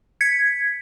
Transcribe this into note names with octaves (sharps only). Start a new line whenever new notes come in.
G#6 B6 C#7